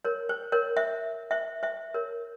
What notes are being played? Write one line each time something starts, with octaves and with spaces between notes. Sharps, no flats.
A#4 C#5
C5
A#4 C#5
C5 E5
C5 E5
C5 E5
A#4 C#5